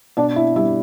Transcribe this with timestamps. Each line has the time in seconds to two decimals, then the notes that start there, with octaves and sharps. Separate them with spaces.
0.17 B2 D4 D5
0.36 E4 E5
0.56 G3 E4 E5